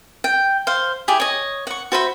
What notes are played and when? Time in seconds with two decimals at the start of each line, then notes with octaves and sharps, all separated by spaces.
0.24 G5
0.67 C5 F5
1.08 E4 G4 G#4
1.20 C#5 D#5
1.67 F#5 C#6
1.92 F#4 C5 E5 B5